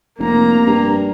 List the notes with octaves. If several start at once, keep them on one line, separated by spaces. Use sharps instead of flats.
F1 A#3 A#5
G2